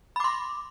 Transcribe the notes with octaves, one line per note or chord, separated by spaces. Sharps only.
B5 C6 D6